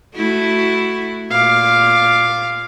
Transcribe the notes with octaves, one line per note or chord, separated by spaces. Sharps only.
A3 E4 F#4
A#2 F5 D6